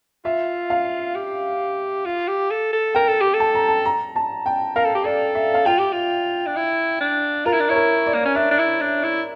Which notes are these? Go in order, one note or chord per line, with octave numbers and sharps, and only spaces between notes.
F4 E5
F5
G4
F4
G4
A4
A4
A#4 G5
A4
G4
A4
A5
A#5
A5
A#5
A5
G5
A#4 F5
A4
G4
A4 D5
E5
F5
F4 G5
G4
F4
D4
E4
D4
F4 A#4
E4
D4
E4 C#5
A#4
D5
A#3
C#4
D4 E5
D4
E4
D4
E4